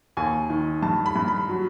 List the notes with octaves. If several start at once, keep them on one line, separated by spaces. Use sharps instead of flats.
D#2 G#5
D#3
G2 A5
B5
G2
B5
F#3